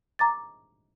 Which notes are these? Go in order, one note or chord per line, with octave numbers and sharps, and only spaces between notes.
A#5 D6 A6